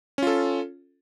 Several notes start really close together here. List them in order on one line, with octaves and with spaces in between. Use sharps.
C#4 F4 A4